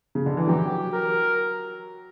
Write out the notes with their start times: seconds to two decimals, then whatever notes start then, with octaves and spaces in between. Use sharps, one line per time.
0.15 C#3
0.26 D3
0.37 E3
0.48 F#3 G4
0.93 A#4